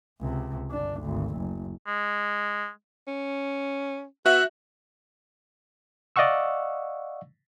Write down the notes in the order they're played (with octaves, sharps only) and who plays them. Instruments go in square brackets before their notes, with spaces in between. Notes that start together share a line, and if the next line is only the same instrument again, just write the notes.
[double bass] C#2 C3
G1 D4
G#1 D2
F#1
[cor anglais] G#3
[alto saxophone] C#4
[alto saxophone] B3 [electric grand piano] F#4 E5 [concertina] F#6
[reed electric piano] D5 D#5 F5 F#5 C#6 E6